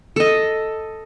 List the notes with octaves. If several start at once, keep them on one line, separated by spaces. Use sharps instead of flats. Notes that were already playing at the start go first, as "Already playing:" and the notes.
A4 D#5